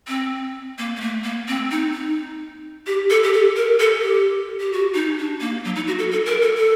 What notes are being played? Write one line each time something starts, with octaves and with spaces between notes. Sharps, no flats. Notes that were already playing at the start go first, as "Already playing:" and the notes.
C4
A#3
A#3
A3
A#3
C4
D#4
D#4
G4
A4
G4
A4
A#4
A4
G4
G4
F#4
D#4
D4
A#3
F#3
D#4
F#4
A4
A4
A#4
A4
A4